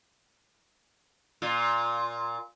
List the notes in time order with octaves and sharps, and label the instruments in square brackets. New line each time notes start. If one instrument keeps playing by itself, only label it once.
[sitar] A#2 F4